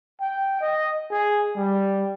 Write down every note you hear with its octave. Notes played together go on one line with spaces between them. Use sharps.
G5
D#5
G#4
G3